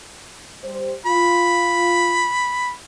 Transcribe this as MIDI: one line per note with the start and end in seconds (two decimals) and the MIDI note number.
0.63 0.93 55
0.63 0.93 72
1.06 2.26 65
1.06 2.71 83